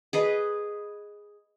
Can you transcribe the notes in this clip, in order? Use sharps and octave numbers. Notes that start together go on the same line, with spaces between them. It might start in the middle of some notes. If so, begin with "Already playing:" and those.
G#4 B4 D#5